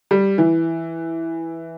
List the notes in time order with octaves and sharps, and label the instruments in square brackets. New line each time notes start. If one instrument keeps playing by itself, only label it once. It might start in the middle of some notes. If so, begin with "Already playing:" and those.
[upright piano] G3
E3